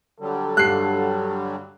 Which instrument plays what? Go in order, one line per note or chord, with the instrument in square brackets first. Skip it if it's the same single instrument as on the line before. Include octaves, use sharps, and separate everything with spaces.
[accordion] D3 F#3 G3 [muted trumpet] A4
[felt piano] G2 [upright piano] F#6 C7